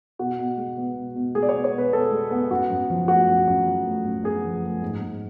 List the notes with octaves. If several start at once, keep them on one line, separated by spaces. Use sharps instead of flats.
B2 F#4
B2
G#3
B3
B2
B2
G#3 G#4
D5
C#5
B3
C#5
B2 B4
B2 A4
G#3
B3
F#2 F#4
F#2
F3
A3 F#4
F#2
F#2
F3
A3
F#2
F#2 G#4
F3
A3
G#2
G#2